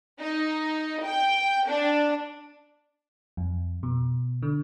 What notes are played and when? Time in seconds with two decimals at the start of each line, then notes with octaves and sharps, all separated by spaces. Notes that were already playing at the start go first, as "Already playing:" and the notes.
0.20 D#4
1.05 G5
1.68 D4
3.37 F2
3.83 B2
4.43 D3